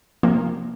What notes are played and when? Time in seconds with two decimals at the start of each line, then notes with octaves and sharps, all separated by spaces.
0.23 C3 F3 A#3